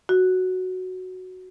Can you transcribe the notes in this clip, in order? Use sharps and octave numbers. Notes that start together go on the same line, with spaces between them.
F#4